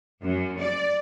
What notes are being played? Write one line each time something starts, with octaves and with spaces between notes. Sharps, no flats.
F#2
D5